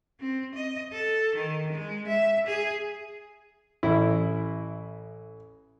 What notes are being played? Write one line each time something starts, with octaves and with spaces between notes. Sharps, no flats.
C4
D#5
A4
D#3
G#3
E5
G#4
A1 E4